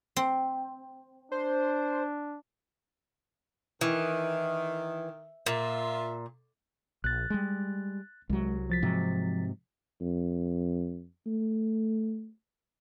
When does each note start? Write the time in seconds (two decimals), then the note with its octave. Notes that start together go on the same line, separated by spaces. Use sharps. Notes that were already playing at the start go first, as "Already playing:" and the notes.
0.16 C4
1.32 D4 C5
3.81 D#3 E3
5.46 A#2 F4 E5
7.04 A#1 F#6 A6
7.30 G3 G#3
8.30 C2 F#3 G#3
8.70 F3 A6 B6
8.82 G#2 C3 F#3
10.01 F2
11.26 A3